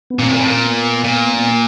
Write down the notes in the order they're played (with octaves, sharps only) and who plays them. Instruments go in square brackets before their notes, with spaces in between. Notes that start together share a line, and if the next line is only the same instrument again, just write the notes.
[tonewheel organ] B3
[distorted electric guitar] A#2 [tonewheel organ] C4
[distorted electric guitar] A2
A#2
A2
A#2
[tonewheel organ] C4
B3
[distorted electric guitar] A#2
[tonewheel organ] B3
A#3